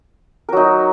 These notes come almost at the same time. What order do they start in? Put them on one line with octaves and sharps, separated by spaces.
A#4 F#3 D#4